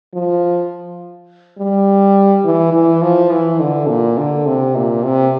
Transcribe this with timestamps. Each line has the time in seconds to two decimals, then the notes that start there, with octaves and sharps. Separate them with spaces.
0.13 F3
1.58 G3
2.44 E3
2.73 E3
3.02 F3
3.31 E3
3.60 D3
3.88 A#2
4.18 D3
4.46 C3
4.76 A#2
5.04 C3